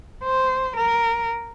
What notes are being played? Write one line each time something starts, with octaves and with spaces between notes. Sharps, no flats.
C5
A#4